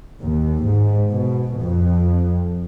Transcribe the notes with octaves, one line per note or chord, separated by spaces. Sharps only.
D#2
G#2
B2
F2